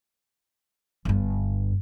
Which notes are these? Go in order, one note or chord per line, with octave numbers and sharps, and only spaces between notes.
G1 G2